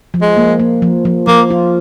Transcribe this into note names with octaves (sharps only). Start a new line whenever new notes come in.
F3
G#3
A#3
A#3
F3
F3
F3 A#3
F4